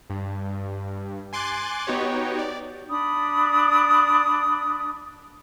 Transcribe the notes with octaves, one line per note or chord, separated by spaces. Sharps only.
G2
G#5 C6 D6 F#6 A6
B3 D#4 F#4 G4 C#5
D5
D4 B5 D#6